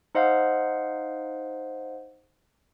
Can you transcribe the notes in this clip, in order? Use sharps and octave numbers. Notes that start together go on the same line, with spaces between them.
D#4 C5 D#5 F5 F#5